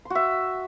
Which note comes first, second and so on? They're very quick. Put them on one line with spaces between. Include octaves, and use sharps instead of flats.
C6 F#4 E5